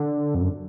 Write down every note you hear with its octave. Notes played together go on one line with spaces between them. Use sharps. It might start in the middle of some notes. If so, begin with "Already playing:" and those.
Already playing: D3
F2
F#2